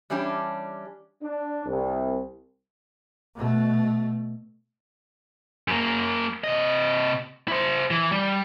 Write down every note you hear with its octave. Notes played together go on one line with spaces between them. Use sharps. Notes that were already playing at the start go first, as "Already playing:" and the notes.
E3 G3 C#4 D4 G4
D4
C2
B2 A3
F#2 A#3
C3 D#5
E4 C5
E3
G3